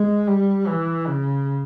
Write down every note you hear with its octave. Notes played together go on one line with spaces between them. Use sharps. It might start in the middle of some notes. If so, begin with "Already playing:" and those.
Already playing: G#3
G3
E3
C#3